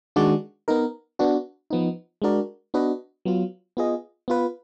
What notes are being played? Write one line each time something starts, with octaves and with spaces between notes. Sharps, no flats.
D#3 G#3 D4 F#4 D5
B3 D#4 A#4
B3 D4 F#4
F3 B3 D#4
G#3 D4 F#4 A#4 D5
B3 D4 F#4 B4 D#5
F#3 B3 F4
B3 F4 G#4 D#5
B3 F4 B4